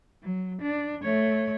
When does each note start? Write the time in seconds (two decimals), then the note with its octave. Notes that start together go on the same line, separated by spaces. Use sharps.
0.23 F#3
0.62 D4
1.03 A3 C#5